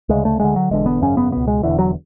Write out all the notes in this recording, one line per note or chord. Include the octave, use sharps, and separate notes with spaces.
D2 C#3 G#3
A3
D2 D3 G#3
F#3
E1 E2 D3 G#3
B3
G#1 F#2 C#3 C#4
B3
C#2 B2 B3
G#3
E1 E2 D3 E3
F#3